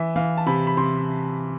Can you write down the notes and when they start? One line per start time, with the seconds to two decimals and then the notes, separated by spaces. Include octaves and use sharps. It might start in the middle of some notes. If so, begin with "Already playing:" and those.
Already playing: E3 E5
0.16 E3 F5
0.37 A5
0.46 C3 B5
0.67 B5
0.77 C3 C6